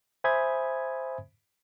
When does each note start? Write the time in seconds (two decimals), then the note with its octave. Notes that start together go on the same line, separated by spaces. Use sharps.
0.24 C5 E5 G#5 B5 D#6 G#6